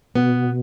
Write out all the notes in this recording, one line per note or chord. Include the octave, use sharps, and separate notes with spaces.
B2 B3